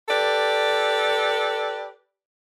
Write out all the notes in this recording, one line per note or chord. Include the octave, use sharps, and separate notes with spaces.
G4 A4 B4 D5